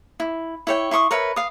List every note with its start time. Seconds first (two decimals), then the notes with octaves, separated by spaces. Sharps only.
0.20 E4
0.67 E4 C#5 G5
0.91 E4 C6 C#6 D#6
1.11 A#4 B4 C#5 E5
1.36 F5 D#6